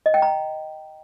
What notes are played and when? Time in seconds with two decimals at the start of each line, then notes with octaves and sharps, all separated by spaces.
0.06 D#5
0.14 G5
0.22 A#5